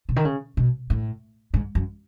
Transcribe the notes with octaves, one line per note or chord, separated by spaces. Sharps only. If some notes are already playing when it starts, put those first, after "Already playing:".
B2
D#3
C#3
B2
A2
G#2
F#2